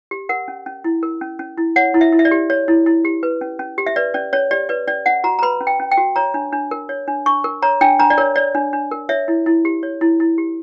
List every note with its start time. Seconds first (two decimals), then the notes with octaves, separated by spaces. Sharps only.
0.11 G4
0.29 A#4 F#5
0.48 C#4
0.66 C#4
0.84 E4
1.03 A#4
1.21 C#4
1.39 C#4
1.58 E4
1.76 C#5 F#5
1.94 E4
2.01 E5
2.12 E4
2.19 E5
2.25 D5
2.31 G4
2.50 C#5
2.68 E4
2.86 E4
3.05 G4
3.23 B4
3.41 C#4
3.59 C#4
3.78 G4
3.87 E5
3.96 B4 D5
4.14 C#4 D5
4.33 C#4 C#5
4.51 G4 D5
4.69 B4 D5
4.88 C#4 D5
5.06 C#4 F#5
5.24 F#4 A#5
5.39 A#5
5.42 B4 B5
5.61 C#4
5.67 G5
5.80 C#4
5.92 G5
5.97 F#4
6.16 C#5 A#5
6.34 D4
6.53 D4
6.71 A#4
6.89 C#5
7.08 D4
7.26 D4 C#6
7.44 A#4
7.62 C#5 A#5
7.81 D4 G5
7.99 D4 A#5
8.10 D5
8.18 A#4 C#5
8.36 C#5 D5
8.55 D4
8.73 D4
8.91 A#4
9.09 C#5 E5
9.28 E4
9.46 E4
9.65 G4
9.83 C#5
10.01 E4
10.20 E4
10.38 G4